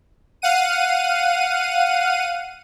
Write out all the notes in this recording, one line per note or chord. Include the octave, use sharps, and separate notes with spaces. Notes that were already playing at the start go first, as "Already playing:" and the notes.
F5 F#5 D#7